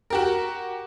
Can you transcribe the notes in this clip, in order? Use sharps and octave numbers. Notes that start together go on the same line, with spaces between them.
F#4 G4 A#4